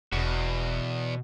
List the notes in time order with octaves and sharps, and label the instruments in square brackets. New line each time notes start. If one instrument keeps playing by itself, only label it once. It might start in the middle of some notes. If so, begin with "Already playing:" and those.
[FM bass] E1 [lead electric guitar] E2 [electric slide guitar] B2 F#4